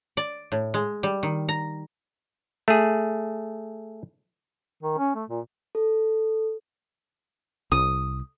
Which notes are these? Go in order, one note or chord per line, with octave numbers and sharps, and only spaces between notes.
D5
A2
G#3
G3
D#3
A#5
A3 G#4
D#3
C#4
A3
A#2
A4
C2 D#6